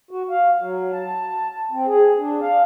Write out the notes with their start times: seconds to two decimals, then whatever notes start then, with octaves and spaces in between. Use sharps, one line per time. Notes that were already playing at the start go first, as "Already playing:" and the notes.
0.11 F#4
0.30 F5
0.61 F#3
0.93 A5
1.71 C4
1.87 G#4
2.18 D4
2.41 F5